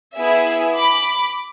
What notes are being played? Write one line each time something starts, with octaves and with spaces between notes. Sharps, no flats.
B3 E4 G#4 E5 G#5
B5 D6